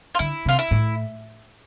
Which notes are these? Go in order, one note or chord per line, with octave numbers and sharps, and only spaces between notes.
F4
D3 E4
C3
F4
E4
A2